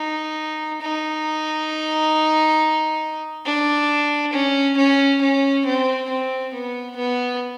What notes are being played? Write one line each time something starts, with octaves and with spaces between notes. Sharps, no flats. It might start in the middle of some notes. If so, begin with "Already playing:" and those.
Already playing: D#4
D#4
D4
C#4
C#4
C#4
C4
C4
B3
B3